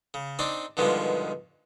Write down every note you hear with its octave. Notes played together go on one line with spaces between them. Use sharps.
C#3
C4 D4 D#4 D5
G2 B2 D3 D#3 F3 G#3